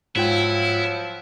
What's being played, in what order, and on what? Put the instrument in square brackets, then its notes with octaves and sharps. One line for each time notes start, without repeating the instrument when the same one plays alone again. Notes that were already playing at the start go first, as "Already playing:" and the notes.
[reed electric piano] G#2 F4 G5 [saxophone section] F3 F#3 [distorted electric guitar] E4